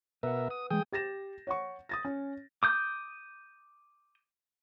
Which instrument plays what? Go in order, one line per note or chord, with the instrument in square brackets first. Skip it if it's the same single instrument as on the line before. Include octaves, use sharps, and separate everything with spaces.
[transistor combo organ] B2 A#4 E5 [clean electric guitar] B4 F#5
[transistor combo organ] D#6
[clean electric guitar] E3 G#3 [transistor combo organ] G#4 G5 D#6
[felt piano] G4 A6 A#6 E7
C#5 F#5 C#6
D#6 A6 A#6
C#4
[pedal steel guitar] D6 D#6 G6